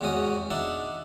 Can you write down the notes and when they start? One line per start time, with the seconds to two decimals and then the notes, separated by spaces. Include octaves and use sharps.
0.01 E2 G#2 C3 C#4 F#4 D#6
0.51 D4 D#4 E5 F#5